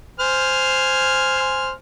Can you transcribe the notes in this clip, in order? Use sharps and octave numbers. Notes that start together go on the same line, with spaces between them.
C5 G#5 F6